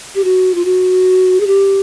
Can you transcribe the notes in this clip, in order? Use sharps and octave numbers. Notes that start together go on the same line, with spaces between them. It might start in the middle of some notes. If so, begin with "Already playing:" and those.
G4
F#4
F4
F#4
G#4
G4